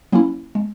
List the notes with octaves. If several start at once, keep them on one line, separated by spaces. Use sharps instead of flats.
F#3 A#3 C#4 E4
G#3